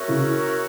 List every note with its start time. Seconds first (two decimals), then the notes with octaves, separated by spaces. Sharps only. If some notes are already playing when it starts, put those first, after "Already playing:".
Already playing: C#4 F#4 A#4 E5
0.08 C#3 E3